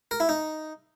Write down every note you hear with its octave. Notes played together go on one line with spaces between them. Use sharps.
A#4
E4
D#4